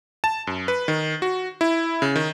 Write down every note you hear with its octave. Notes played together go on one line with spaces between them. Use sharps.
A5
F#2
B4
D#3
F#4
E4
C#3
D#3